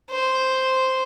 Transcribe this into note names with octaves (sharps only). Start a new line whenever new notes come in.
C5